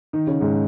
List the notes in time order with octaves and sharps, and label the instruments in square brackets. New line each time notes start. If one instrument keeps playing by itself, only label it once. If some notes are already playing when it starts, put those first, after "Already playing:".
[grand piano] D#3 D#4
C#3 C#4
G#2 G#3